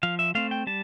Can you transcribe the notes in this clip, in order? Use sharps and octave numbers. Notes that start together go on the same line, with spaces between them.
F3 F5
E5
A3 C4 F5
G5
G3 A5